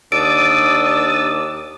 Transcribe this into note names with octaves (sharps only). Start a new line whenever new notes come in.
D#2 D4 D5 D#6 E6 A6 D7